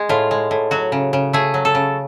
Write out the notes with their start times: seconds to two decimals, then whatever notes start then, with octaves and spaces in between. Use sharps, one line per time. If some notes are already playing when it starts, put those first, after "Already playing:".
Already playing: G#3
0.09 A2 F4
0.31 G#3
0.51 A2
0.71 F#3 F#4
0.92 C#3
1.13 C#3
1.33 A3 G#4
1.54 F#3
1.65 A4
1.75 C#3